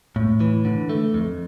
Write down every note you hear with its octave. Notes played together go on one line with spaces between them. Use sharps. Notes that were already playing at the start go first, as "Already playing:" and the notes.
A2
E3
D3
A3
F2